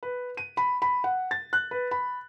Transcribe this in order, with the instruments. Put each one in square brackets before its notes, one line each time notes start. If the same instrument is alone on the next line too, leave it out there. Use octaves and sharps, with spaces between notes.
[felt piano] B4
D#7
B5
B5
F#5
A6
F#6
B4
B5